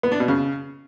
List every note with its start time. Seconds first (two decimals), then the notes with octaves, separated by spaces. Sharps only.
0.03 B3
0.12 D4
0.20 B2
0.28 C#3